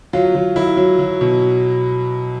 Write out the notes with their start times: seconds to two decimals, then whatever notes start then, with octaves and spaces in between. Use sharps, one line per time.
0.13 F#3 F4
0.35 F#3
0.56 F#3 E4
0.77 F#3
0.99 F#3
1.21 B2